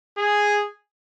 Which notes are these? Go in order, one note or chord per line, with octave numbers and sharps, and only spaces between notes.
G#4